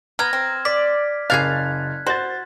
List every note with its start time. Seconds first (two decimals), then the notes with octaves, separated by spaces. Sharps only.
0.19 B3 A#5 F6 G#6
0.33 C4
0.65 D5 B6
1.30 F#1 G#4 C#5 F5 F#6 G#6 A6
2.06 F#4 C5 A6